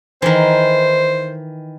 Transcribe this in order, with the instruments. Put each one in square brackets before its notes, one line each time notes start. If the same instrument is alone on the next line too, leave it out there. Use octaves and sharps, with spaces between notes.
[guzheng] D#3 E3 [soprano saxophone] C5